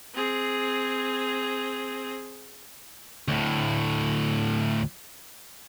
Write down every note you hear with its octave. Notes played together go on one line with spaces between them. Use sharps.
C4 G#4
D2 A2